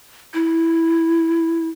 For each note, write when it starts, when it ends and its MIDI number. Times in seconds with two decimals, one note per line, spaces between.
0.34 1.69 64